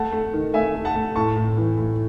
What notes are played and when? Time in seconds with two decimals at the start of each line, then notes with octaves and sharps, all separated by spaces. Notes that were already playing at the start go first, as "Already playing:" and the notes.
Already playing: A3 F#5 A5
0.12 A3
0.34 D#3
0.54 A3 E5 G#5
0.75 A3
0.85 F#5 A5
0.95 A3
1.15 A2 A5 C#6
1.36 A2
1.57 E3
1.78 A2